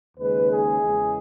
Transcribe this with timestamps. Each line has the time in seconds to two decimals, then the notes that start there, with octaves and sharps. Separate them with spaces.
0.16 D#2 C#3 G#3 B4
0.48 G#4
0.79 E2 C#3 G#3